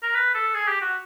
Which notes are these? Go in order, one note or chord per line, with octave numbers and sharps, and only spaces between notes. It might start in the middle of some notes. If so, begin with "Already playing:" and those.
A#4
B4
A4
G#4
G4
F#4